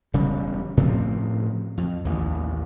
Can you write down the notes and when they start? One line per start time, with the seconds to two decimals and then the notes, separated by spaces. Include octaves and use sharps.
0.13 E1 C#3 G3
0.77 A2 C#3 F3 C4
1.78 F2
2.05 A1 D#2